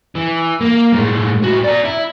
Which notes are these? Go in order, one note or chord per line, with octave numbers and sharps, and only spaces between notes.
E3
A#3
A2 G#3
A2 F#4
D5 A#5
E4